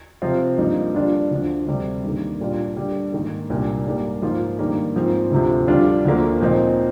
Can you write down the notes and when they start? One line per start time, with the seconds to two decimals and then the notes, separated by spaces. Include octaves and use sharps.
0.22 C3 F3 C4 F4
0.58 G2 F3 A#3 D#4
0.94 D3 G3 D4 F4
1.31 D2 D3 F3
1.67 D2 C3 G3 C4
2.04 G2 D#3 A#3
2.40 A#2 G3 A#3 D4 F4
2.76 D3 G3 D4
3.13 G#2 D#3 A#3
3.50 C2 A#2 G3 D4
3.86 G#2 G3 A#3
4.22 G#2 F3 A#3 F4
4.59 G2 D#3 G3 A#3
4.96 G#2 F3 C4
5.31 D2 C3 F3
5.68 D3 G3 D4 F4
6.05 D2 D3 F3 A#3
6.40 A#2 F3 C4 D#4